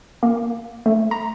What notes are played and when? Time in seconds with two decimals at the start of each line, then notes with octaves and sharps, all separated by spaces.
0.23 A#3
0.86 A3
1.11 A#5